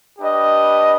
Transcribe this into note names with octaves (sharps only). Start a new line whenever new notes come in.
D4 G4 B4 D#5